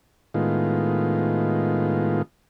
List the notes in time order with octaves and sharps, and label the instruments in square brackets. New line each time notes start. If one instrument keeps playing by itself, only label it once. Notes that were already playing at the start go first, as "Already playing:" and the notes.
[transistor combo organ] A2 D#3 G#3 B3 F4